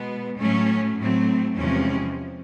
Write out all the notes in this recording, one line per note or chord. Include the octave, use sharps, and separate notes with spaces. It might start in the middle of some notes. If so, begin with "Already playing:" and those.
Already playing: B2 G#3 B3
A2 F#3 A3 C#4
A2 F#3 A3 C4
E2 C3 F3 G#3 C4 C#4